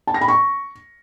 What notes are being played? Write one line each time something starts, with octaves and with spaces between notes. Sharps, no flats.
A5
A#6
B5
C#6